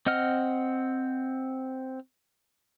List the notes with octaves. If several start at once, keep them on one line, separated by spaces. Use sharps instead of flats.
C4 D#5 F#5 F6